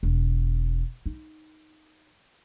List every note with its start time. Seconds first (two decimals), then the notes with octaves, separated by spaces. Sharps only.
0.03 E1
1.06 D#4